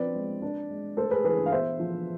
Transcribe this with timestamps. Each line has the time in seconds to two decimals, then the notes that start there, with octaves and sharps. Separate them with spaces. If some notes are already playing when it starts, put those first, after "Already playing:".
Already playing: F3 C4 B4 D5
0.15 G#3
0.42 D4
0.70 G#3
0.97 A3 A4 C5
1.11 G#4 B4
1.25 E3 G#4 B4
1.46 F5
1.52 B3 C5 E5
1.79 F3